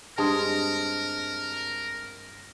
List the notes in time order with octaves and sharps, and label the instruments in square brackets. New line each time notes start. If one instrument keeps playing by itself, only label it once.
[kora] G2 G#3 C4 [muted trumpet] A#4 [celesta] A5 D#6